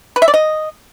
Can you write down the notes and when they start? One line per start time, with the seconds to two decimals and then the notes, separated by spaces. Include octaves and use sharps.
0.16 B4
0.22 E5
0.28 D5
0.34 D#5